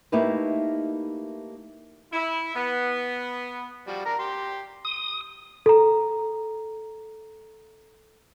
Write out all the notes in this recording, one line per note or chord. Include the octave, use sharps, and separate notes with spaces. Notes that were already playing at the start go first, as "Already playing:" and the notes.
A3 A#3 D#4 E4 G4 B4
E4
B3
F3 G3 F#4
D4 A#4 A#5
G4 C6
D#6
A4 A#5